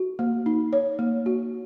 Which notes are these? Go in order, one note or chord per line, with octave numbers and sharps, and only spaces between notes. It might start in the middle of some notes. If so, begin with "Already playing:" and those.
Already playing: F#4
A#3
D#4
C#5
A#3
F#4